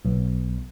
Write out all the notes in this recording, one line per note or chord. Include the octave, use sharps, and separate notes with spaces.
B1